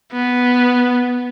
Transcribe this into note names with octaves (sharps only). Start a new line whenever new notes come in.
B3